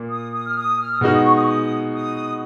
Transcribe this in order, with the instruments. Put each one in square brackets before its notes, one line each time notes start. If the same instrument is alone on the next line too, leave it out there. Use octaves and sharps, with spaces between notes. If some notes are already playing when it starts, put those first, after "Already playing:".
Already playing: [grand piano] A#2 A#3
[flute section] D#6
D#6
F6
D#6
F6
D#6
[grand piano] B2 G#3 D#4 F#4 [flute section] F6
[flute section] D#6
C#6
D#6
C#6
D#6
D#6
D#6